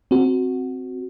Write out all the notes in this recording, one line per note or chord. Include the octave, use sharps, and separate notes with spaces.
C4 F#4